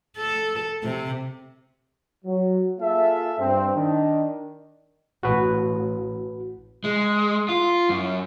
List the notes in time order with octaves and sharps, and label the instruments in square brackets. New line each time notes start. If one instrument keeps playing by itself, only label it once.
[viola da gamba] A4
C3
[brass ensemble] F#3
A#3 F4 G#4 A4 E5
G2 C4
D#3 D4
[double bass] A1 [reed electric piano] F#4 B4
[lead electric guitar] G#3
F4
F#2